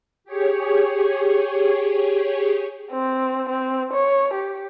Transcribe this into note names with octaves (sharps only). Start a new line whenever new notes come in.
G4 G#4 C#5
C4
C4
C#5
G4